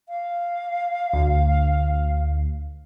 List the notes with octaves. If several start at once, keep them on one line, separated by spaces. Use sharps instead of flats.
F5
D2